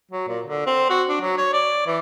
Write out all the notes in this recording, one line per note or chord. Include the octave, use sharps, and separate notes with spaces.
F#3
A#2
D3
C4
F#4
D4
F#3
C#5
D5
E3